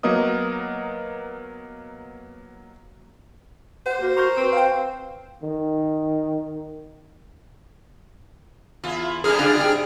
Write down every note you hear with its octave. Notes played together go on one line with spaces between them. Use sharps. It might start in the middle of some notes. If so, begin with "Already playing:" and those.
F#3 A#3 B3 A#4 D#5 D#6
G4 C5 F#5
A#3 F#4
A#4 C6 C#6 G6
C4 B4
F5 G5
D#3
E2 E4 F4
C3 G3 D4 G#4 A#4 F6
D3 D4 F4
G#2 G5